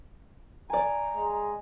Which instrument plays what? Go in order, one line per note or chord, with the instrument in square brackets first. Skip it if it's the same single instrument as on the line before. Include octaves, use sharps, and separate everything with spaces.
[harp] D5 G#5 [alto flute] A#5
[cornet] G#3